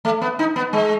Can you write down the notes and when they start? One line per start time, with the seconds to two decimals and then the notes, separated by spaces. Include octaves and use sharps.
0.05 A3
0.21 B3
0.39 D#4
0.56 B3
0.73 G#3